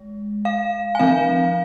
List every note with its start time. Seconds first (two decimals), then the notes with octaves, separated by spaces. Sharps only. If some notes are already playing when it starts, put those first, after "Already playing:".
Already playing: G#3
0.45 F5
0.95 G#5
0.99 F3 C4 F5